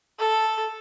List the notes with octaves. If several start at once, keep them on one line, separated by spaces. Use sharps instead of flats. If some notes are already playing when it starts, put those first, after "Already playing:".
A4